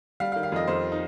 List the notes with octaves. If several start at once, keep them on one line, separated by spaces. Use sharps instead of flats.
G3 F5
F5
D#3
F5
F2 D#5
F2 C5
D#4